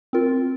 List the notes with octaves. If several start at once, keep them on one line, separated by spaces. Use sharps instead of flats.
C4 F4 A#4